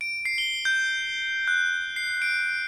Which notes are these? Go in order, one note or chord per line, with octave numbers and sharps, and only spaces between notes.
D7
C7
G7
G6
F#6
C7
D7